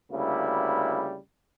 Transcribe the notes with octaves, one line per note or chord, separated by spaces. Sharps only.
D2 C#3 G3 A#3 E4